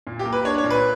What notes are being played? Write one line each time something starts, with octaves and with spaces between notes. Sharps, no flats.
A#2
G4
A#3
B4
D4 C#5
C#5
A#2
B4